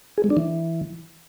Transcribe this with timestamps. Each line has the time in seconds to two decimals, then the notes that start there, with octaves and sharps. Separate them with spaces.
0.18 G#4
0.24 G#3
0.30 D4
0.37 E3